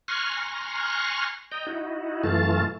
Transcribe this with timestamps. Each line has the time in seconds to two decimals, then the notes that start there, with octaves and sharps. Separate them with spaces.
0.08 G#5 A#5 C6 C#6 F6 F#6
1.52 D#5 G5 A#5
1.67 D#4 E4 F#4
2.24 F#2 E3 A3 F4 A5